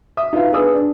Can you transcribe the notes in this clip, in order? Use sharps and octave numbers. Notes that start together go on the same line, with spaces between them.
E5 D#6
D#4 F4 B4 E5 F5
B3 D4 G#4 B4 D#6 E6
D4